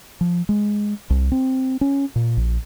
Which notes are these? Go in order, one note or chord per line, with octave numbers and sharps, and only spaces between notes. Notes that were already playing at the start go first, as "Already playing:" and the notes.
F3
G#3
C2
C4
C#4
A#2
A#1